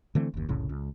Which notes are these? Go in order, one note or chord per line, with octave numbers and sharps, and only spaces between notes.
D3 E3 A3 C4
F#1 D#2
F1 C2 A2 C#3
C#2